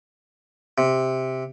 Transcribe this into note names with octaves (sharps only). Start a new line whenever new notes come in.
C3